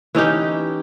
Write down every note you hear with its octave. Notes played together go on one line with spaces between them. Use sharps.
E3 C#4 D#4 G4